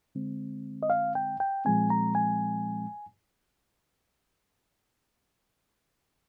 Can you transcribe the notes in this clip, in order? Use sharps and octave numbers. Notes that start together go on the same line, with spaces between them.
D3 G#3 C4
D#5
F5
G5
G5
A#2 F3 G#3 C4 G#5
A#5
G#5